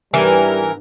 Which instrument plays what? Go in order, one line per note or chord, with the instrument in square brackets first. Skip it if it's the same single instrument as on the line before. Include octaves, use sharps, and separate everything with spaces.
[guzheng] G#2 B3 D4 [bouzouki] E3 [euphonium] G3 [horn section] A#4